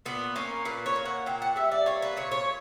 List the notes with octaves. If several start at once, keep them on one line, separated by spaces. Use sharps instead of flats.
A#2 B3
A#3 C#4
A#2 B4
C#5
A#3
F#5
A#2 G5
F#5
G3 E5
D5
A#3 C#5
B4
A#2 C#5
C#5